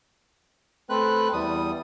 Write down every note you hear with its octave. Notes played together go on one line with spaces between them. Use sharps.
A3 C4 B4 F#6
E2 G3 D#6